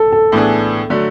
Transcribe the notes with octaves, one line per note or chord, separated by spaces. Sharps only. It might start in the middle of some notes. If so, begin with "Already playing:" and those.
Already playing: A4
A4
A2 E3 B3 D4 G#4
D3 F#3 A3